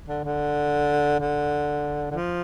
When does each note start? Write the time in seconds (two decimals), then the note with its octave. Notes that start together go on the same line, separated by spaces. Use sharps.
0.08 D3
0.24 D3
1.20 D3
2.11 D3
2.14 F3